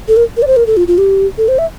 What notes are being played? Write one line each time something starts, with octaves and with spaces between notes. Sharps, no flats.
A4
A#4
A#4
D5
C5
A#4
A4
F4
F4
G4
A4
C5
E5